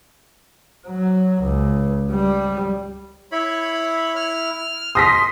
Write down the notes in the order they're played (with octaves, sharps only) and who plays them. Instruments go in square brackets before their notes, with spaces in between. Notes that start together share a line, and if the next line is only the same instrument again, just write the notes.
[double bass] F#3
C#2
G3
[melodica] E4 [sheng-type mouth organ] C#5 B5
[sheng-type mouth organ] F6
[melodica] C6 [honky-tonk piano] D#6 A#6 B6